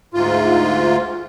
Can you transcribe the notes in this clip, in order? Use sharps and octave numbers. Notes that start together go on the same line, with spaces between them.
D2 G#2 F4